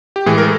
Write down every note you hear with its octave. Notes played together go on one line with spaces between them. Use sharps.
G4
A2 E3 G#3 G#4
A#4
A4